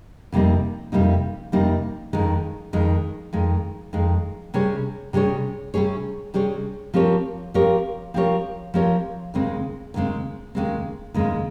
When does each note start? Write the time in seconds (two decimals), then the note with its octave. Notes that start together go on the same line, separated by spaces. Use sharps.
0.32 F2 C3 G3 A#3 D#4
0.92 F2 C3 G3 A#3 D#4
1.52 F2 C3 G3 A#3 D#4
2.13 F2 D#3 G#3
2.73 F2 D#3 G#3
3.33 F2 D#3 G#3
3.93 F2 D#3 G#3
4.54 C3 G3 C#4 G#4 C#5
5.13 C3 G3 C#4 G#4 C#5
5.74 C3 G3 C#4 G#4 C#5
6.34 C3 G3 C#4 G#4 C#5
6.94 F3 C4 G4 A#4 C#5
7.54 F3 C4 G4 A#4 C#5
8.14 F3 C4 G4 A#4 C#5
8.74 F3 C4 G4 A#4 C#5
9.34 D#2 C#3 G#3 C4
9.94 D#2 C#3 G#3 C4
10.55 D#2 C#3 G#3 C4
11.14 D#2 C#3 G#3 C4